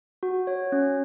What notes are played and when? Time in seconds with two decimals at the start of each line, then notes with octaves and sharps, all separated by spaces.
0.23 F#4
0.47 C#5
0.72 C#4